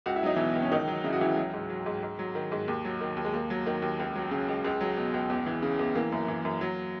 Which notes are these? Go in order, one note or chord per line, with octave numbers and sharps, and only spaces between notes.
C#2 F#4
E4
F#3 D#4
B2 E3 E4
C#2
C#4
C#2 D#3 D#4
F#3
C#3 E4
F#4
C#2 E3 E4
F#3
G#2
F#3
G#2
G#2
F#3
D#3
G#2
D#2
F#3
D#3
D#2
G#3
D#2 A#3
F#3
D#3
D#2
C#2
F#3
C#3
C#2
C#2 G#3
F#3
B2
C#2
E2
E3
C#3
E2
E3 A#3
F#2
E3
F#2
F#3